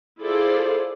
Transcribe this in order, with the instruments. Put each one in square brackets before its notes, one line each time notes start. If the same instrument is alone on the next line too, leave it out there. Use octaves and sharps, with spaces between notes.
[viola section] E4 F4 G#4 A4 C5 D5